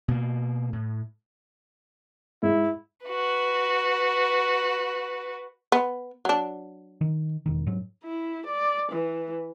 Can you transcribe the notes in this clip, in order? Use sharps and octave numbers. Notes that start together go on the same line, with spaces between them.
B2 A#3
A2
G#2 E4
F#4 B4
B3
F#3 D4
D#3
E1 D#3
G#2 F#3
E4
D5
E3